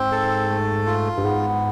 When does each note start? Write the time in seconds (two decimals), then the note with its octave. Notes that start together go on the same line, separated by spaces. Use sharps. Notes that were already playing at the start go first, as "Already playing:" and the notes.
Already playing: G#2 C4
0.12 A4
0.49 A3
0.86 F4
1.17 G2
1.24 G#2 B3